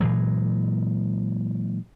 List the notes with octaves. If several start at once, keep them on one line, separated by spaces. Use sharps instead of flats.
A#2 E3 F#3 G#3